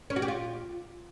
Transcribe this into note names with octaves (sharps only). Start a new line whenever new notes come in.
C#4
F#4
G4
F4